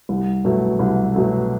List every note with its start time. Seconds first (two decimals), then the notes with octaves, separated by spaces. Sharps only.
0.09 C2
0.45 B2 F#3 A3
0.79 C2
1.14 B2 F#3 A3